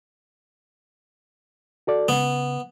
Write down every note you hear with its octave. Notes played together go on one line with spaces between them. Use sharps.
F#4 A4 D5
C#3 B3